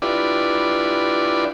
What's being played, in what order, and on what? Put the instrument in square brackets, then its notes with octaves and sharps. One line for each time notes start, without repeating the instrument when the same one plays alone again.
[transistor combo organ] D4 E4 F4 G4 B4 D5